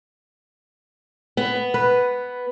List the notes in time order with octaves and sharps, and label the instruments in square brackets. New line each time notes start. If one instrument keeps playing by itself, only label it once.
[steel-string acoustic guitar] B3
[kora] B4